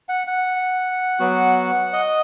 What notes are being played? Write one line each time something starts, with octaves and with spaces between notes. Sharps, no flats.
F#5
F#5
F#3 B3 F#4
D#5